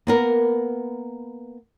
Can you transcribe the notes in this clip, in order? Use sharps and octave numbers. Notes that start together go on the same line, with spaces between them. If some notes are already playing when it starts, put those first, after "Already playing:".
A#3 B3 A#4